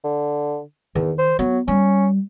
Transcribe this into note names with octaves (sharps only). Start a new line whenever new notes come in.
D3
E2 D#3
C5
F#3 B3
G3 C#4